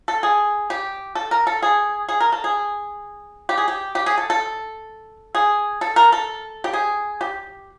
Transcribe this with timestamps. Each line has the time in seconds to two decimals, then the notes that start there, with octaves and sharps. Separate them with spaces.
0.08 A4
0.23 G#4
0.70 G4
1.15 A4
1.31 A#4
1.47 A4
1.63 G#4
2.09 G#4
2.20 A#4
2.32 A4
2.44 G#4
3.49 G4
3.58 G#4
3.68 G4
3.95 G4
4.06 G#4
4.18 A4
4.30 A4
5.35 G#4
5.81 A4
5.96 A#4
6.12 A4
6.64 G4
6.73 G#4
7.21 G4